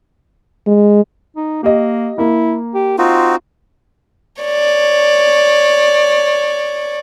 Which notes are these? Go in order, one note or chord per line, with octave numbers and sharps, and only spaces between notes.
G#3
D#4
A#3 G4 D#5
A#3 E4
G4
C4 D#4 F4 F#4
C#5 D5